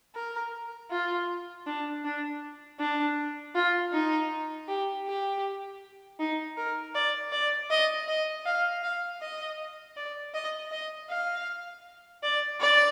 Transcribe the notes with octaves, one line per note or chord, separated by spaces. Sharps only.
A#4
F4
D4
D4
D4
F4
D#4
G4
G4
D#4
A#4
D5
D5
D#5
D#5
F5
F5
D#5
D5
D#5
D#5
F5
D5
D5